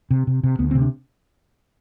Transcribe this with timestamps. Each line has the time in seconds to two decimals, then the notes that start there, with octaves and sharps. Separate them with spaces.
0.11 C3
0.27 C3
0.43 C3
0.59 D2 B3
0.71 C4
0.75 C3
0.82 D4